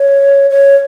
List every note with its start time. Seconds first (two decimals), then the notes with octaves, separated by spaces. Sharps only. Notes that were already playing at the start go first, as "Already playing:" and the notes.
Already playing: C#5
0.51 C#5